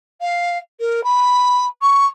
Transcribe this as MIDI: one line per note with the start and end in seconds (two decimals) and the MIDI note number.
0.20 0.58 77
0.80 1.03 70
1.04 1.66 83
1.81 2.06 85